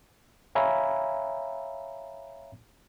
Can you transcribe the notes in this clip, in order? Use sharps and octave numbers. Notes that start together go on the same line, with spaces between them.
C#5 E5 F5 G#5 A#5 B5